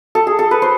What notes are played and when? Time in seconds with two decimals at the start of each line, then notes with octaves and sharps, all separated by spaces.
0.15 A4
0.27 G#4
0.39 A4
0.51 B4
0.62 C5